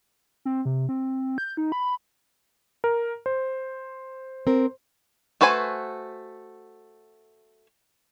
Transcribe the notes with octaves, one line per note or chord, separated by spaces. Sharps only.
C4
C3
C4
G6
D#4
B5
A#4
C5
C4 A#4
A3 F#4 B4 C5 G#5